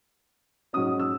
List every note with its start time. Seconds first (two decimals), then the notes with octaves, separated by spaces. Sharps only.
0.73 G#2 F#3 C#4 D#6
1.00 E6